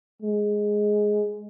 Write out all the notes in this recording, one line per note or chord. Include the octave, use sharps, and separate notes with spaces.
G#3